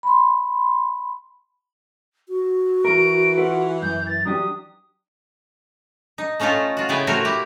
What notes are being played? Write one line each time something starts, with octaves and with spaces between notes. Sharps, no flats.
B5 C6
F#4
E3 A#4 D7
F4 A4 B4 F#5
F#2 G6
A6
F#3 D4 G4 D#6
D#4
A3 C#4 D#4 F4 A4 E5
F4 F#4
C#3 B3 C4 E4 G5 G#5
A3 C4 F#4 A#4 C5 C#5
E4 G4